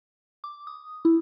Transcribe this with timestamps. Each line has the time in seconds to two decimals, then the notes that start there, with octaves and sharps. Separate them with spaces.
0.44 D6
0.67 D#6
1.05 E4